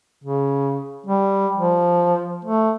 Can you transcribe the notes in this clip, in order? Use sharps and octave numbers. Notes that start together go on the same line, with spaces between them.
C#3
G3
F3
A3